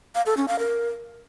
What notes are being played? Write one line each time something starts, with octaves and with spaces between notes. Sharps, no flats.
F5
A4
C#4
F5
A#4